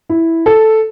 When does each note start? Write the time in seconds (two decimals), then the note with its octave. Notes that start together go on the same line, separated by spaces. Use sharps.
0.09 E4
0.46 A4